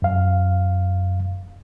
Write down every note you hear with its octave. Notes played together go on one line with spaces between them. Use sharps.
F#2 F5